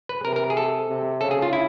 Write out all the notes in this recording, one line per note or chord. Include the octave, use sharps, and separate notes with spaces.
B4
C3 A#4
A#4
G#4
A4
C3
C#3 A4
G#4
F4
E4